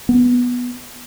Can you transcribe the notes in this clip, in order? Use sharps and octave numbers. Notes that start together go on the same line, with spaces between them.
B3